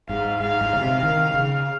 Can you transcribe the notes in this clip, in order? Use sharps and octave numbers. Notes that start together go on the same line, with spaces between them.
G#2 F5
G#2 F5
G#2
C#3
C3
D#3
C#3